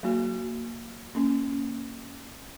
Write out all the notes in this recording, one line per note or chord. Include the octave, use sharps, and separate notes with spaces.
F#3 A#3 F#4
A#3 C#4